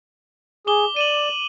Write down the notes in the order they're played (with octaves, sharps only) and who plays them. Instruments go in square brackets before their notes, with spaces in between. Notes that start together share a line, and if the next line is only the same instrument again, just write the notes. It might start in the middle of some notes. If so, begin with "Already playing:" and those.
[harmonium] G#4 [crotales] D6 G7
[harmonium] D5 [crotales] D#7 E7 F#7